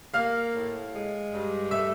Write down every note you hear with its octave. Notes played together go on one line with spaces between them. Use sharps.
A#3 F5 F6
A2
G#3
G2
A3 E5 E6